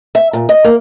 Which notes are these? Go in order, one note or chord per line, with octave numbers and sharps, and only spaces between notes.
E5
A#2
D#5
A#3